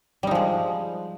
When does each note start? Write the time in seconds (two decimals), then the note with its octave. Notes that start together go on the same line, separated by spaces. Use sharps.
0.23 G3
0.27 D#4
0.31 F3
0.35 G#3